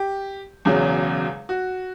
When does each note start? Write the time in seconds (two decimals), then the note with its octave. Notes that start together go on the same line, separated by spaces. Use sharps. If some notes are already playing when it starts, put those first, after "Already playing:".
Already playing: G4
0.65 E1 E2 C#3 F#3
1.49 F#4